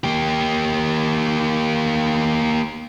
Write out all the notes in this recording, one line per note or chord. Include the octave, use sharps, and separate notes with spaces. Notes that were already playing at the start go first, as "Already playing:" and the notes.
A#3 G4